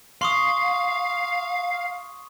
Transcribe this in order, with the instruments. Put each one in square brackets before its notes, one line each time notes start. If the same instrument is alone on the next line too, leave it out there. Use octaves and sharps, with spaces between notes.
[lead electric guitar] F5 [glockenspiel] C6 C#6 D#6